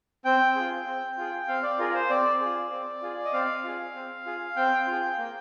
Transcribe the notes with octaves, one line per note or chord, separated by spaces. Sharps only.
C4 G5
F4 G#4
C4
F4 G#4
C4 F5
D5
F4 G#4 A#4
A#4
C5
C4 D5
F4 G#4
C4
F4 G#4
D#5
C4 F5
F4 G#4
C4
F4 G#4
C4 G5
F4 G#4
A#3